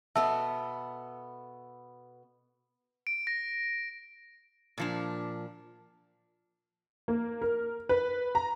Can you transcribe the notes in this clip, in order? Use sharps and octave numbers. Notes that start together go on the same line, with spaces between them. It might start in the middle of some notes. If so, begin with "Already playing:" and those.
B2 B3 A4 E5 A5 E6
D7
A#6
A#2 F3 D4
A#3
A#4
B4
A#5